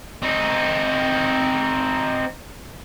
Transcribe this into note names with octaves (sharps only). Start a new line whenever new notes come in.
C4 D#4